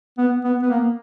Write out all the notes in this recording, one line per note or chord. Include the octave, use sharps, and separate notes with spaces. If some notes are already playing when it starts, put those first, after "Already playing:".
B3
B3
B3
A#3